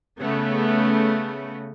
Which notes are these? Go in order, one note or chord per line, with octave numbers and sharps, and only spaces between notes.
C#3 A3 B3